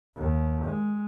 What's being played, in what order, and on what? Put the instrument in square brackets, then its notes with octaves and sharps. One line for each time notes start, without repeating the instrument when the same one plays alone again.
[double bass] D#2
G#3